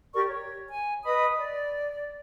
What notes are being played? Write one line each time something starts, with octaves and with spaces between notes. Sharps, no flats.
G4 A#4 D5 C#6
C#5
G#5
B4 D#5 B5 D#6
D5